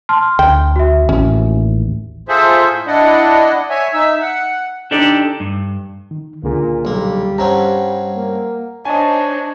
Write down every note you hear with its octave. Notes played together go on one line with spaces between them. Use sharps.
A5 C6 F6
D2 G5
F#4 E5
A1 D#2 A2 C#4
F4 G#4 A4 C5 E5
A2
D4 E4 D5 D#5 F#5
C#5 E5 G#5
D#4 E5 E6
F#5
D4 D#4 G4 A4 D5
G2
D#3
C#2 A#2 D3 G#4
B1 G3 A#3
G2 C4 C#4 F#5 A#5
A#3
D4 D#4 C5 C#5 D#5 G#5 A5